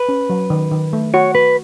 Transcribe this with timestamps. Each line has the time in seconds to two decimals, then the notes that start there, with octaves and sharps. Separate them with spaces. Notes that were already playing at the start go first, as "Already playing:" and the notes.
Already playing: B4
0.09 C#4
0.30 F#3
0.50 D#3
0.72 D#3
0.93 A3
1.14 F#4 C#5
1.35 F#4 B4